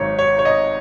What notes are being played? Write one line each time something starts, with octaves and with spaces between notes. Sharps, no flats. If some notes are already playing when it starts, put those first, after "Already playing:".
Already playing: G#1 G#2 D#3 F#3 C#5
C#5
C#5
D#5